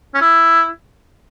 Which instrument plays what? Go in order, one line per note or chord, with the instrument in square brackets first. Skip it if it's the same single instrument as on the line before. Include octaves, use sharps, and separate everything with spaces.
[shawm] C#4
E4